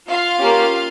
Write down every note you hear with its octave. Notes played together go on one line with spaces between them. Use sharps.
F4 F5
A#3 C#4 G4